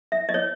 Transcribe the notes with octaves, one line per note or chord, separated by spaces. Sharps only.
E5
D#5
C#5